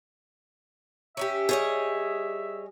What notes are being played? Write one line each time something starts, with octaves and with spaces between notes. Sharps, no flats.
C#4 D#4 G4 E5
G3 G#4 C#5 D#5